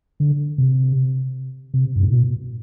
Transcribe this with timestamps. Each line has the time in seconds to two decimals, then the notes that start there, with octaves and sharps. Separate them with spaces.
0.20 D3
0.58 C3
1.74 C3
1.96 G2
2.03 A2
2.12 B2